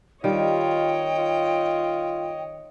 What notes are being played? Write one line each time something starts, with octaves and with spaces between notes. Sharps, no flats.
D#3 G3 F4 C#5 D#5 G5
F4